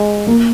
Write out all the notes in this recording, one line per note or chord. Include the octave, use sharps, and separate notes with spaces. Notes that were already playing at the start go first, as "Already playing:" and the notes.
Already playing: G#3
A#3